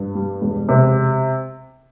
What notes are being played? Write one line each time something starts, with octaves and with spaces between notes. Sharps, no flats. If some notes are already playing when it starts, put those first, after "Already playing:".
Already playing: G2
G3
E1
C3